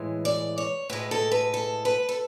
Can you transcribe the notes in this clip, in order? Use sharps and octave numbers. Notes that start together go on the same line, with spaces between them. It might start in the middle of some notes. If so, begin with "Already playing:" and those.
Already playing: A2 E3 G#3
D5
C#5
A2 G#3 B4
A4
B4
A4
B4
A4